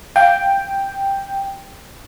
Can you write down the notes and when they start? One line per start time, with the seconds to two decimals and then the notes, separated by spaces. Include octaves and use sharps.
0.16 F5 G5